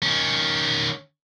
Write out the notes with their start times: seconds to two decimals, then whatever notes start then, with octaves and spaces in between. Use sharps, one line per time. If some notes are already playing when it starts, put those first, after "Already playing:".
0.03 D#3 C#4